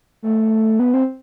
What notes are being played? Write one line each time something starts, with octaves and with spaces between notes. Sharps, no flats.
A3
B3
C4